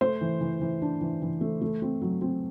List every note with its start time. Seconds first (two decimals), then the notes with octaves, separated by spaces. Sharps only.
0.01 A3 C5
0.21 E3
0.41 E3
0.61 E3
0.82 D4
1.01 E3
1.22 E3
1.41 A3
1.61 A3
1.82 C4
2.01 F#3
2.21 C4